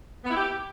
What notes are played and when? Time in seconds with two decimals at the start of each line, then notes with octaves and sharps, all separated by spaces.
0.24 B3
0.29 E4
0.35 G4